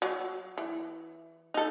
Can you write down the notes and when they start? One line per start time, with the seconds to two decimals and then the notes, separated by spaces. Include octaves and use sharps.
0.02 F#3
0.58 E3
1.54 D#4 A4